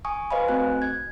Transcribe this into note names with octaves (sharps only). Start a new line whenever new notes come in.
G#5 C#6 D#6
B4 C5 D#5 F5 G#5 B5
A3 C4 F#4 D#5 G#5 F#6
G#6